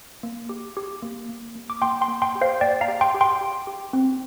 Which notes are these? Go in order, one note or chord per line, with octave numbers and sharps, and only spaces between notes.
A#3
G4
G4
A#3
A#3
A#3
D6
A#3 G5 C6
G5 C6
A#3
G5 C6
G4
C5 F5
A#3 D5 G5
F5 A#5
G4
G5 C6
G4
G5 C6
G4
G4
C4